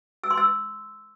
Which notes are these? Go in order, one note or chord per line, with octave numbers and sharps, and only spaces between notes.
E6
C6
E6